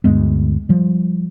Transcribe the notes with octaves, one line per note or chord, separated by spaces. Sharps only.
D2 G2 G#3 B3
F3 G3